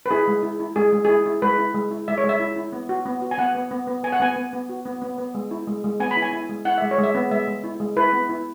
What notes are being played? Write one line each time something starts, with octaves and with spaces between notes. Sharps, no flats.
B4
E4 G#4
G#3
E4
E4
G#3 G#4
G#3
E4 G#4
E4
G#3 B4
E4
G#3
E4
G#3 E5
C#5
G#3
E5
E4
E4
B3
F#4
B3
F#4
G#5
B3 F#5
B3
B3
B3
B3 G#5
F#5
B3 G#5
B3
B3
F#4
B3
B3
B3
G#3
E4
G#3
G#3
B3 G#5
B5
E4
G#5
E4
G#3
E4 F#5
G#3 E5
C#5
G#3 E5
B3
G#3 E5
G#3
E4
G#3
E4 B4
B3
E4